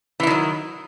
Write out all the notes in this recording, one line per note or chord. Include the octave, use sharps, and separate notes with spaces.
D#3 E3 F#3 E4